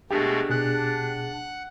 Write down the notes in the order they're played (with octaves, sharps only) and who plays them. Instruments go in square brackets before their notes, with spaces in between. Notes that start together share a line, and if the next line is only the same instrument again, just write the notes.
[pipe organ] B2 G#3 A3 [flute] D4 [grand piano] G4
[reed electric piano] B2 G#4 F#6 [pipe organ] F#5